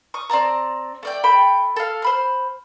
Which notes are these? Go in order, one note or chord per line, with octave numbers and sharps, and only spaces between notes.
C#6 D#6
C4 D5 A5 A#5
A3 D5 G5
A4 G5 B5
A4 F5
C5 B5 F6